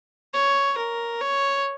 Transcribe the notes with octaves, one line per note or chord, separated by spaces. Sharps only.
C#5
A#4
C#5